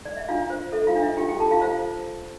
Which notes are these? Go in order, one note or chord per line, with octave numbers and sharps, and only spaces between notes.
D5
E5
D4 F4 F5
C5
A4 E5
F4 F5
D4
E5
F4 G4 G5
G4 G5
F4 A4 A5
F4 F5
F4 C5 F5